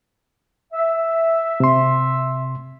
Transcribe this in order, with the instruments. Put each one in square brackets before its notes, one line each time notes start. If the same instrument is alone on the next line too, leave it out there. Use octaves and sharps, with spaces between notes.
[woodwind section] E5
[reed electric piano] C3 C6